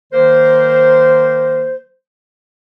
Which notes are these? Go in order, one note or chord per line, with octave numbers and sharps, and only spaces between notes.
D#3 F#3 A#3 A#4 C5